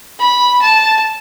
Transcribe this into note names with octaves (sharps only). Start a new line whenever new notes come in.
B5
A5